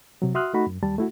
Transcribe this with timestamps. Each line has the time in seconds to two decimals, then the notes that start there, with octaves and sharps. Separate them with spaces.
0.22 C3 F#3
0.35 F#4 E5 C6 D#6 F6 F#6
0.54 A3 D#4 F#4 B5
0.67 F#2
0.83 D#2 G3 A5
0.98 A3 E4 F#4